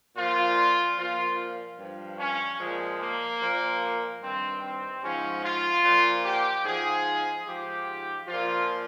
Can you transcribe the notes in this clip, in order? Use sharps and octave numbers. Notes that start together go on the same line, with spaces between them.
A#2 F3 F4
A#2 F3 F4
G2 F3
C#4
A#2 F3 G#3
A#3
A#2 F3
G2 D#3 C4
C4
G#2 F3 C#4
F4
A#2
F3
G4
G#2 F3 G#4
G#2 F3 G4
A#2 F3 F4